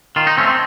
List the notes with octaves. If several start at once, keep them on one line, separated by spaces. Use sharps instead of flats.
D#3 F4
D#4
A3 C4 C#4
C4